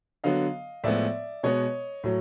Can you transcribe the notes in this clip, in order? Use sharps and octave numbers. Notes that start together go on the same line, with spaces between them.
D3 F#3 B3 D#5 F5
A2 F3 G#3 B3 D5 E5
B2 G#3 B3 C#5 D#5
A2 F#3